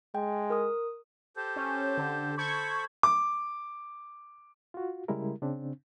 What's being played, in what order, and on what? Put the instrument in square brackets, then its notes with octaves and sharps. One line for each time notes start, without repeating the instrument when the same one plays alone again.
[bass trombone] G#3 [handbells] G5
[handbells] A#4 D#6
[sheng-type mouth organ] G4 A4 C5
[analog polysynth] C#4
D3
[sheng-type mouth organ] A4 C5 B5 [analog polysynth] C#6 G#6
[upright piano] D6
[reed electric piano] F4 F#4
C#3 G3 G#3 E4 A#4
C#3 C4 D4